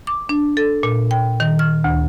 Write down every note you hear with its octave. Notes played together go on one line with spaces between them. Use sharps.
D6
D4
A4
A#2
G5
D#3
F6
D2